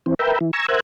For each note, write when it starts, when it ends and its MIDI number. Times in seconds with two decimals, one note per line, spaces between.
0.06 0.14 52
0.06 0.14 60
0.19 0.39 70
0.19 0.39 71
0.19 0.39 76
0.19 0.39 79
0.41 0.51 52
0.53 0.66 80
0.53 0.66 82
0.53 0.66 85
0.53 0.66 88
0.68 0.80 70
0.68 0.80 72
0.68 0.80 76
0.68 0.80 78
0.68 0.80 80